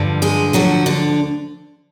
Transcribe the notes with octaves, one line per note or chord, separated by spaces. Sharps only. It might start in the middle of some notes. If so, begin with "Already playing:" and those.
Already playing: G2 D3 F3
G#3 G#4
D2 D3 F3 F#3 F#4
D3 D4